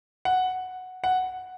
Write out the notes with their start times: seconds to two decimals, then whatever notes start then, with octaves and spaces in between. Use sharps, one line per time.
0.25 F#5
1.04 F#5